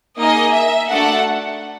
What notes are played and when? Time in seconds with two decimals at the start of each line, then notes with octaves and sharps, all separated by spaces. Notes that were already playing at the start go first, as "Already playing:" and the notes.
0.20 A#3 D#4 G#4 D#5
0.55 E5
0.90 A3 D4 F#4 A4 F#5